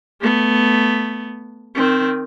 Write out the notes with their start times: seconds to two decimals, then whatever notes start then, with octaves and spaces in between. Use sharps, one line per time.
0.20 A3 B3
1.75 D#3 C4